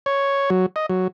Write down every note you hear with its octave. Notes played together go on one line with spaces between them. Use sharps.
C#5
F#3
D#5
F#3